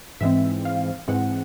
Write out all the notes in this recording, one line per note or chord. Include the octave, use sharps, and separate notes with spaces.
G#2 E3 G#3 C4 E5
F5
G#2 E3 G#3 C4 F#5